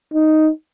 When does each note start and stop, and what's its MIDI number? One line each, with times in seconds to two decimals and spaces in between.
0.14 0.50 63